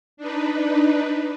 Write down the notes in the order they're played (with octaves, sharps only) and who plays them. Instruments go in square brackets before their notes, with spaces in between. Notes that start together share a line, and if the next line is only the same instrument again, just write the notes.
[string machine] D4 D#4 B4